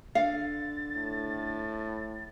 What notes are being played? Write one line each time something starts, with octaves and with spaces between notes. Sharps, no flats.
D3 F5 A6
A2